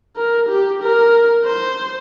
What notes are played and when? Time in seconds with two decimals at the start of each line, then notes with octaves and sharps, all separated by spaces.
0.17 A#4
0.49 G4
0.82 A#4
1.45 C5